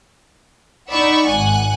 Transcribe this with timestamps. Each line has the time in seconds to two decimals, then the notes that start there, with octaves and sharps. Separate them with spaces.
0.90 D#4 D5 F#5 B5 C#6 E6
1.27 G#1 F#5 G#5 F#6